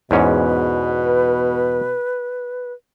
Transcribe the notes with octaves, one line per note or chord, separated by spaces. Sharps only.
E2 G#2 B2 C#4 B4